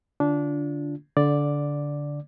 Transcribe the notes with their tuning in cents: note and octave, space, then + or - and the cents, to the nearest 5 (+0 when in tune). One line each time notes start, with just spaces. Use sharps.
D3 +0 D4 -20 F4 +0
D3 -20 D5 +0 D6 +0